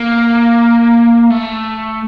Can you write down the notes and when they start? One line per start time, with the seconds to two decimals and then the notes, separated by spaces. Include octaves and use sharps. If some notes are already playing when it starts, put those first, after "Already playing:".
Already playing: A#3
1.31 A3